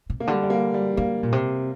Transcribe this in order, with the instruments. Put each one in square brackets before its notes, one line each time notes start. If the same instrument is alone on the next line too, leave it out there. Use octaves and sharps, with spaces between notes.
[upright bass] C3
[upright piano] A#3
[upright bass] D3 [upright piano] G3
[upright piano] G3
A#3
G3
[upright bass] D3 [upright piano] A#3
[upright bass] A#2
C3